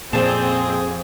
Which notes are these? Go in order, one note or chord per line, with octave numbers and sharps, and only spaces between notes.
F2 A#2 C4 G#4 A5